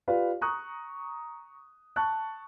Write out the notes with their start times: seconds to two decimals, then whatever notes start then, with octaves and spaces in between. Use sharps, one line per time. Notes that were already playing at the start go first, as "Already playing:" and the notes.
0.08 F4 G4 B4 D5 F5
0.41 A#5 C#6 D#6 F#6
1.96 A5 C#6 F#6